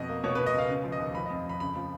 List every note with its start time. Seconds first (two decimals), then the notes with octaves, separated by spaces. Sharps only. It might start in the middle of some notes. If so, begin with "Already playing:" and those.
Already playing: F2 B2 D#5
0.09 A#3
0.24 B2 C#5
0.35 B4
0.39 B2
0.46 D#5
0.54 C#2 F5
0.69 C#3
0.84 F3
0.92 D#5
0.99 D#2
1.14 F3 B5
1.26 D#5
1.30 F2
1.45 F2 B5
1.60 C#3 B5
1.76 F3